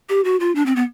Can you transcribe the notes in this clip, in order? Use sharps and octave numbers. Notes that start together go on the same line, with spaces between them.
G4
F#4
F4
D4
C4
B3